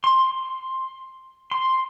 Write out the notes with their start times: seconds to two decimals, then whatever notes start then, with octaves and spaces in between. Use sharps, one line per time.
0.04 C6
1.51 C6